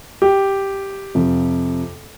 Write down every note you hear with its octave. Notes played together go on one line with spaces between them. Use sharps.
G4
F2 C3 F3